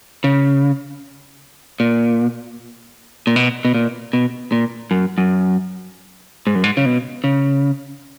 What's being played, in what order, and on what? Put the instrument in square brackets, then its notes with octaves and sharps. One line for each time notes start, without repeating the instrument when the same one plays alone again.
[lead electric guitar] C#3
A#2
A#2
B2
B2
A#2
B2
A#2
F#2
F#2
G#2
F#2
G#2
C#3
B2
C#3